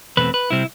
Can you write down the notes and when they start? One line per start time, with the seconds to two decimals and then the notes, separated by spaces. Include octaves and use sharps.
0.17 E2 B2 A3 C4 B4
0.34 B4
0.50 C3 G3 C4 E4